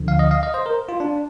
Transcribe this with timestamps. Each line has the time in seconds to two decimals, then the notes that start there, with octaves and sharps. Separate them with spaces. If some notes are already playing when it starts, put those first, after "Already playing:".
Already playing: D2 D3 F3
0.08 F5
0.19 D#5
0.31 F5
0.43 D#5
0.54 C5
0.66 A#4
0.89 F4
1.00 D4